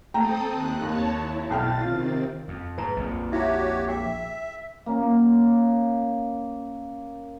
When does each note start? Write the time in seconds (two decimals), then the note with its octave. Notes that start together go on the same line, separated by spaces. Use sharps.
0.14 A3 C4 A4 G5 A#5 D#6
0.50 D#2 F#6
0.82 D#2 C#5 A5
1.19 E4
1.50 B1 G5 F6 A6
1.81 C3 D#3 C4 F4
2.48 F2
2.78 G#2 B4 A#5
2.96 A#1 F2 A#2
3.32 E4 F#4 G4 C#5 E5
3.88 G#4 E5 G5
4.86 A#3 C#4